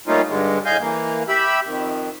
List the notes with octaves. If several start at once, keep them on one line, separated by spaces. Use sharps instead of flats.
G3 A3 A#3 C#4 D#4 F4
G2 D3 G#3
A2 D#5 F5 G#5 G6
E3 A#3
G4 E5 B5 E6
F2 D#3